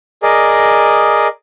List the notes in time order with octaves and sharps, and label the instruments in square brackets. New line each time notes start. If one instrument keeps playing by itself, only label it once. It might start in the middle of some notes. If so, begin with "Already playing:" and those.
[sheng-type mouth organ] G#4 A#4 D5 D#5